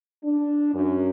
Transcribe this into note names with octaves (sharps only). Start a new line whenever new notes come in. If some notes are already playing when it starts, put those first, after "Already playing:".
D4
F#2